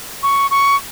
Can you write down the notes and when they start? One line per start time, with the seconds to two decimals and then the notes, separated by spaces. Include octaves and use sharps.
0.23 C#6
0.51 C#6